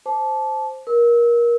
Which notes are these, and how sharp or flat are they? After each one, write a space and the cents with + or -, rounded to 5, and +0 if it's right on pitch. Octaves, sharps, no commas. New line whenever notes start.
C5 +0 A5 -20 D6 -10
A#4 +25 E6 -25